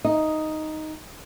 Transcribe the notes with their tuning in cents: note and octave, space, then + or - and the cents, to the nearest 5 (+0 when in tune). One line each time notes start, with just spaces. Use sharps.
D#4 +0 D#5 +0